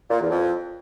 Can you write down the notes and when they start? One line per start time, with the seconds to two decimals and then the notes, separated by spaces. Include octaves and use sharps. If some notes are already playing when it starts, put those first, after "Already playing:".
0.10 A#2
0.20 E2
0.30 F2